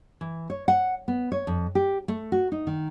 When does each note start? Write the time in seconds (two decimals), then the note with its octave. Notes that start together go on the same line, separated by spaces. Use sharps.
0.21 E3
0.50 C#5
0.68 F#5
1.08 B3
1.32 C#5
1.47 F2
1.75 G4
2.08 A3
2.32 F#4
2.52 D#4
2.67 D#3